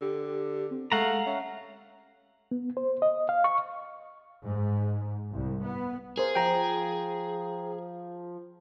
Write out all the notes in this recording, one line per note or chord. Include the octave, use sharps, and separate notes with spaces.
D3 G4
C4
G#3 A3 F5 F#5 A#5
C#4 E5
B3
C5
D#5
F5
C#6
G#2
C2
B3
G#4 A#4 C5
F3 G5 A#5